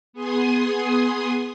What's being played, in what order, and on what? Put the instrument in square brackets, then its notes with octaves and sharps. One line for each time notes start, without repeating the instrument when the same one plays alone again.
[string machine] B3 G#4 G#5 C6 D#6